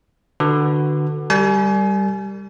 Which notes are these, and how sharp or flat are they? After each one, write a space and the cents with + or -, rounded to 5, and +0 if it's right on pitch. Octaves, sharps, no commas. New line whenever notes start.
D3 +25 F#4 +0 B4 +5
G3 +0 A#4 -40 G#5 +30